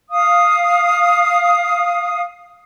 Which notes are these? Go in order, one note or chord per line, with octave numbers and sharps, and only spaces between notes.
F5 D#6